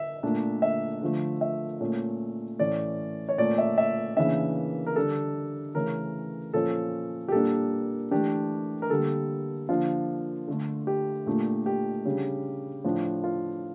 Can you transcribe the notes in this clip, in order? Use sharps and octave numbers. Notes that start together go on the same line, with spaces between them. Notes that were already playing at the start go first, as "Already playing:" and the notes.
Already playing: E5
A#2 A3 D4
E5
D3 F3 A3
E5
A#2 A3 C#4
A2 E3 A3 C#4 D5
C#5
A#2 A3 C#4 D5
E5
E5
C#3 E3 A#3 D4 E5
A#4
D3 G3 D4 A4
C#3 E3 A3 C#4 A#4
A#2 F3 C#4 A4
G4
A#2 G3 A#3 D4 A4
E3 A3 D4 G4
A#4
D3 G3 A#3 A4
D3 F3 A#3 D4 F4
D3 A3 D4
G4
A#2 A3 D4
G4
C#3 G3 D4
A2 F3 A3 D4
F4